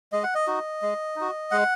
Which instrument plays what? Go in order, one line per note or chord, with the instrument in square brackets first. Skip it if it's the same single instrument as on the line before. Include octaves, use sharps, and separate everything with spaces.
[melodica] G#3 D#5
F#5
D#5
D#4 F#4
G#3
D#4 F#4
G#3 F#5